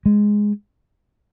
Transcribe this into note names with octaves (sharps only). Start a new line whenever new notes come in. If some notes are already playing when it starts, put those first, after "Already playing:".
G#3